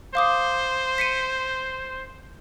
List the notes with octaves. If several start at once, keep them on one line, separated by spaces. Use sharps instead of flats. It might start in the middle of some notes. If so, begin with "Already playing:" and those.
C5 F5 D6 D#6
B6 C#7 D#7